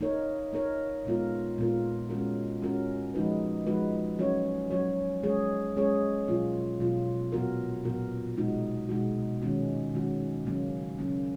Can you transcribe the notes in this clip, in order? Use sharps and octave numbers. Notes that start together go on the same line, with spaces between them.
A#3 D#4 A#4 C#5
A#3 D#4 A#4 C#5
A#2 G#3 B3 F4 A#4
A#2 G#3 B3 F4 A#4
G#3 C#4 F#4 A#4
G#3 C#4 F#4 A#4
F3 G#3 D#4 F#4 B4
F3 G#3 D#4 F#4 B4
F#3 C#4 F#4 C#5
F#3 C#4 F#4 C#5
G#3 C#4 G#4 C#5
G#3 C#4 G#4 C#5
B2 F#3 A#3 F4
B2 F#3 A#3 F4
A#2 F#3 B3 F#4 A#4
A#2 F#3 B3 F#4 A#4
B2 G#3 D#4 F#4
B2 G#3 D#4 F#4
D#3 G#3 C#4 F#4
D#3 G#3 C#4 F#4
C#3 F#3 A#3 C#4
C#3 F#3 A#3 C#4